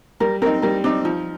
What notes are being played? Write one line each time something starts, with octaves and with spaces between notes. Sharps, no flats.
G3 A#4
C4 D#4 A#4
G3 A#4
C4 D4 D#4
F3 D#4